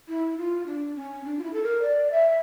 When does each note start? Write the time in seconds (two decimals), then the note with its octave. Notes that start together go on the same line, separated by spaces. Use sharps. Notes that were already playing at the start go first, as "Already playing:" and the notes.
0.08 E4
0.38 F4
0.66 D4
0.96 C#4
1.25 D4
1.39 F4
1.44 E4
1.53 A4
1.63 A#4
1.82 D5
2.11 E5